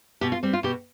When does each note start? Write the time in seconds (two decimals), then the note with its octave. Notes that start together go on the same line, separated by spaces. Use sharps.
0.21 B2 G4
0.32 F4
0.43 G3 C4
0.53 F4
0.63 B2 G4